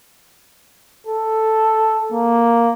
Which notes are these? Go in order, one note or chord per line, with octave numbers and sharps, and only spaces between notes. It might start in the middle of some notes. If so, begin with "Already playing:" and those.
A4
A#3